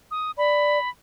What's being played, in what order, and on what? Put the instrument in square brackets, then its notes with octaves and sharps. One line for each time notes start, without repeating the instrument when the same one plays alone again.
[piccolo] D#6
[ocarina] D5 [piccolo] B5